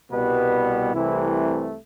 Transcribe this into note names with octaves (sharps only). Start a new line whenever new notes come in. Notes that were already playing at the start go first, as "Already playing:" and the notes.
C2 B2 G3 B3 B4
C2 C3 E3 A3 E4